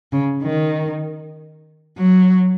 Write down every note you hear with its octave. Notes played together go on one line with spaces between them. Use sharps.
C#3
D#3
F#3